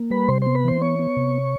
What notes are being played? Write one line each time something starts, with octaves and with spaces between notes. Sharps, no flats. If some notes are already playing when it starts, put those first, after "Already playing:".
Already playing: A#3
G3 B4 B5
C3 C5 C6
B3 C5 C6
B4 B5
E3 C5 C6
B3 C#5 C#6
B3
C3